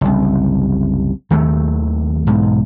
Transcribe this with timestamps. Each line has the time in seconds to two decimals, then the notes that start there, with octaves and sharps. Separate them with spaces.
0.01 F#1 C2
1.31 D#2 D#3 F#3 A3
2.27 B1 G#2